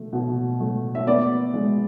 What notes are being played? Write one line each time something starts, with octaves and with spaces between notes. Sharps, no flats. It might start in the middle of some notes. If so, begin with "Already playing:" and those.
Already playing: B2 A3
B2
A3
E5
B3 D5
G#3